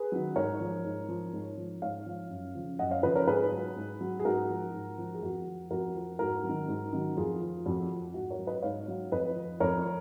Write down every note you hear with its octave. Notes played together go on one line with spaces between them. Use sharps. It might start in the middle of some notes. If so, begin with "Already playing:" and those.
Already playing: G#4 B4
D#3 F#3
G#2 A#4 C#5
F3
G#2
F3
G#2
F3
G#2 C#5 F5
F3
F#2
C#3 F3
F#2 D#5 F#5
C#5 F5
C#3 F3 B4 D#5
A#4 C#5
G#2 G#4 B4
F#3
G#2
F#3
G#4
G#2 F#4 A#4
F3
G#2
F3
G#4
F2 F#4
F3
F2 F#4 A#4
F3
G#2 F#4 A#4
F#3
D#3
G#2
D#3 F#3
F2 F4 G#4
F3
F2 F#4
F3
G#2 F#4
A#4 C#5
F#3
B4 D#5
G#2 C#5 F5
F#3
F2 B4 D#5
F3
F2 A#4 C#5
F3